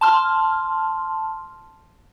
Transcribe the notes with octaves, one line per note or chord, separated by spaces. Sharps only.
A5 C6 F6